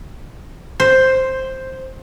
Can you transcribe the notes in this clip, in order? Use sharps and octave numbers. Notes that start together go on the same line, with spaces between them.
C5